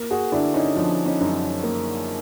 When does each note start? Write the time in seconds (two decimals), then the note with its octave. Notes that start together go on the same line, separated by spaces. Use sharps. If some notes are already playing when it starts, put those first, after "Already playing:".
Already playing: A#3
0.10 F#4 G#4
0.32 D3 D4 E4
0.54 C#4 D#4
0.76 F3 D4
1.05 C#4 D#4
1.21 F#2
1.63 A#3